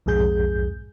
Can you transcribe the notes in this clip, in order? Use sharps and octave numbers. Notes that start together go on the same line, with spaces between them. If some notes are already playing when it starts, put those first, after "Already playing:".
B1 F2 G#2 G#4 G6